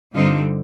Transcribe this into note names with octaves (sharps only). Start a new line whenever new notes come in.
G2 D3 G3 C4 D#4 F4